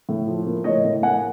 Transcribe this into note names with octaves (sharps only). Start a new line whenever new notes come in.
A2
F3
A#3
A2 C#5 D#5
A2
A#3 F#5 G#5